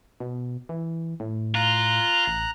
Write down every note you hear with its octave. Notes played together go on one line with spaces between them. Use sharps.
B2
E3
A2
F4 A#5 F#6
A1